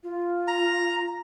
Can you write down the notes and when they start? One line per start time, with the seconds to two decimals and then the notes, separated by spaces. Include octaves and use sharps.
0.03 F4
0.48 A#5